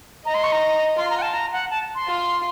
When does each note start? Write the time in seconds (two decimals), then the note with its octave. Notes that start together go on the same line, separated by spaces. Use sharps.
0.25 D#5 A#5
0.34 C6
0.43 C#6
0.52 A#5
0.97 F4 C6
1.10 A#5
1.18 F#5
1.22 A5
1.33 A#5
1.53 F#5
1.71 A5
1.95 C6
2.07 F4